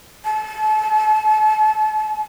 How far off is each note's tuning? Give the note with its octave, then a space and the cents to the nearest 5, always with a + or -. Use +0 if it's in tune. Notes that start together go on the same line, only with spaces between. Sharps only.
A5 -35